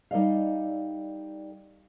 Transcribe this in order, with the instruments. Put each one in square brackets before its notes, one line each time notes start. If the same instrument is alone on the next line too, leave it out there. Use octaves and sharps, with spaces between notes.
[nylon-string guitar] G3 D#4 A4 D5 D#5 F5